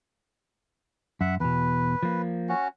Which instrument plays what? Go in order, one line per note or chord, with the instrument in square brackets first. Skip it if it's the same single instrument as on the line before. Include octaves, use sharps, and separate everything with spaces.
[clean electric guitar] F#2 [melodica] E5 F#5
[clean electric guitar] E2 B2 [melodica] B4
[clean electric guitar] F3 A#3
[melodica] C#4 F#4